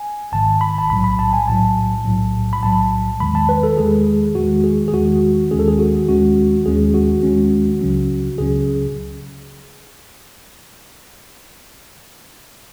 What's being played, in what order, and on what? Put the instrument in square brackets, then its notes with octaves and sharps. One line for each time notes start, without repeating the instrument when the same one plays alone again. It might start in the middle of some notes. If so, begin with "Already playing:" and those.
Already playing: [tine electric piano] G#5
G#1 G#2 D#3 A5
B5
A5
B1 A2 F#3 B5
B5
A5
G#5
B1 A2 F#3 A5
B1 A2 F#3
B5
B1 A2 F#3 A5
E2 D#3 G#3 B5
A5
B4
A4
E2 D#3 G#3 G#4
E2 D#3 G#3 F#4
G#4
G#4
E2 D#3 G#3 F#4
D#2 D#3 G#3 C#4 G#4
A4
G#4
F#4
D#2 D#3 G#3 C#4 F#4
D#2 D#3 G#3 C#4 G#4
F#4
D#2 D#3 G#3 C#4
C#2 C#3 F#3 C#4
C#2 C#3 F#3 C#4 G#4